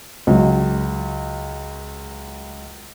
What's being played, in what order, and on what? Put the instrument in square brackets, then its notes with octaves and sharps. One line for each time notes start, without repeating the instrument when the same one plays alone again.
[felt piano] C#2 F#3